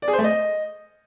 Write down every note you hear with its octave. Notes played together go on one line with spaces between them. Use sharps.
D5
G#4
C5
A3
D#5